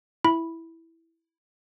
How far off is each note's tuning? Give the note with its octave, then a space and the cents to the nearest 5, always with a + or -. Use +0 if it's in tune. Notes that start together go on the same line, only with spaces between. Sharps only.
E4 +0 B5 -5